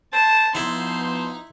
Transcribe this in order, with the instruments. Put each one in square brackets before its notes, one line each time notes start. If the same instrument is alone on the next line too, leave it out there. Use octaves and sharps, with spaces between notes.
[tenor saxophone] C5 [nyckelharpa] A5
[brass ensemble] F3 B3 C5 [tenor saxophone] D#4 [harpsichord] E4 [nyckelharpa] C6